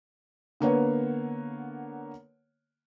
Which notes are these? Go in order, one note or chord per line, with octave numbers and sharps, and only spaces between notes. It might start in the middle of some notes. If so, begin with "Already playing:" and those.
D3 A#3 B3 C#5 F#5